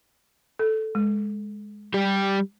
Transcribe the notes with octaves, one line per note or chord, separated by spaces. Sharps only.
A4
G#3
G3 G4